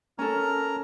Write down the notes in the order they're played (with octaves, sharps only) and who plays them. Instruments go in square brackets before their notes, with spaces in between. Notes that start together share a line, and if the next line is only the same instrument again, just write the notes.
[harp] C#4 A4 [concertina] A#4 A#5